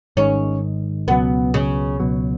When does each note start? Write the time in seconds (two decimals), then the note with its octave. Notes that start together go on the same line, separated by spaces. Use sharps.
0.17 G#1 G#2 D#3 G#3 C#4
1.07 C#2 B2 F#3 B3
1.54 C#3
2.00 C#2 B2 F#3